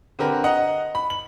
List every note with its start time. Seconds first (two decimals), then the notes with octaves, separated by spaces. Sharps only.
0.19 D3 C4 G4 A#4 B4
0.44 D#5 F#5 A#5
0.95 B5
1.10 F#7